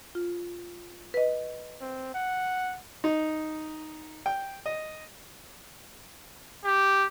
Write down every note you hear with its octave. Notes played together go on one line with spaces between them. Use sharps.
F4
B4 D#5
C4
F#5
D#4
G5
D#5
G4